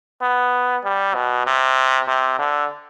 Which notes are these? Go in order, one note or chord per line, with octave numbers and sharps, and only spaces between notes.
B3
G3
B2
C3
C3
D3